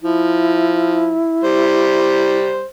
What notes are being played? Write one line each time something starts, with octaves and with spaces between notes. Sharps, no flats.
F3 E4
G3 C5